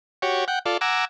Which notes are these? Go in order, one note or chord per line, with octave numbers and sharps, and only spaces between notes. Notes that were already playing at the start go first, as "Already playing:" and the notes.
F#4 G4 C#5
F#5 G5
F4 A4 D5
F#5 G#5 A#5 D6 E6